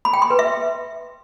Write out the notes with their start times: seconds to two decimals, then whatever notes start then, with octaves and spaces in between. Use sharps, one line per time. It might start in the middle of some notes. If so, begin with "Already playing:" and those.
0.05 B5
0.13 G5
0.22 C6
0.30 B4
0.39 E5